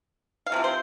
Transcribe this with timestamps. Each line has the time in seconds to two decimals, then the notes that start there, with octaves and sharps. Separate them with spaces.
0.46 F5
0.52 C3 F3 C4
0.64 C5